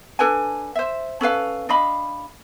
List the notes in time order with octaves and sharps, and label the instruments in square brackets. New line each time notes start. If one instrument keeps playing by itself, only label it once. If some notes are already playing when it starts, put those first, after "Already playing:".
[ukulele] D4 A4 B4 G#5
C5 E5
C#4 A4 B4 F5
D4 D#5 F5 B5